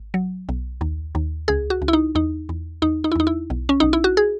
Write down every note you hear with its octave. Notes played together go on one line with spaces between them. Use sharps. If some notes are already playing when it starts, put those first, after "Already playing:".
Already playing: G#1
F#3
B1
D#2
D#2
C#2 G#4
F#4
C#2
E4
D#4
E2 D#4
E2
E2 D#4
D#4
E4
E2 D#4
E4
B1
C#4
B1 D#4
E4
F#4
G#4